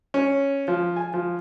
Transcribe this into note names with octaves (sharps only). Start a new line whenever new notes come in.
C#4
F3
G#5
F3